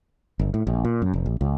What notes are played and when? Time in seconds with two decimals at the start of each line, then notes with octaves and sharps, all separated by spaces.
0.39 G1
0.54 A2
0.67 A#1
0.85 A#2
1.02 F#2
1.13 F1
1.26 A#1
1.41 C#2